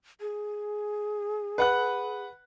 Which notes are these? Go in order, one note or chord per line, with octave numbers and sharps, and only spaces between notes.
G#4
B4 F#5 F#6